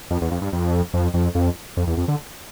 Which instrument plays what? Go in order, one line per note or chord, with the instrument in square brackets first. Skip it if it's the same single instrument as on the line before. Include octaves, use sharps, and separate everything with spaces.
[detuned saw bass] F2
E2
F2
G2
F2
F2
F2
F2
F2
E2
F2
D3